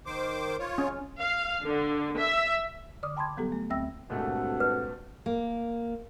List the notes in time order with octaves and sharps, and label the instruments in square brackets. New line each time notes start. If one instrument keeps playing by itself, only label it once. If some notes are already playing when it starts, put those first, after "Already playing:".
[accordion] D#3 C5 D6
F4 C#5
[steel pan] C#4
[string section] F5
D3
E5
[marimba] D3 D5 D6 D#6 F6
G5 A5 B5 C6 D6 G#6
F#3 G3 B3 G4 A4
A3
D2 C4 E5 G5 E6 A#6
[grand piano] C#2 A#2 A3 [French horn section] G2 C4 F#4 [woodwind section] A4 F#5
[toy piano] B4
[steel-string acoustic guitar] A#3